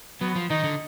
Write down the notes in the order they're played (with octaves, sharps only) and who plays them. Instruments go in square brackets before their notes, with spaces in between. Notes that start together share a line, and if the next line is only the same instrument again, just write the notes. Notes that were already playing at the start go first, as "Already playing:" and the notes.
[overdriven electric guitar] F#3 [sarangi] B3
[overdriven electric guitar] F3
[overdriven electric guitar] D#3 [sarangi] D#4
[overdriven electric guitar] D3